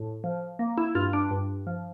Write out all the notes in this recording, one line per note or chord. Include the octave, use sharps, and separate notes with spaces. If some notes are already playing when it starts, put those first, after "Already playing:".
Already playing: A2
F3
A#3
E4
G2 F4
D4
G2
F3